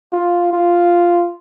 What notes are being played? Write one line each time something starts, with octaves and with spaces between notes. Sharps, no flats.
F4
F4